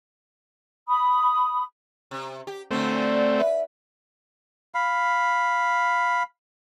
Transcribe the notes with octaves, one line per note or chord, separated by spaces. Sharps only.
B5 D#6
C3
G4
A#2 D3 F#3 A3 C4
B4 E5
F5 B5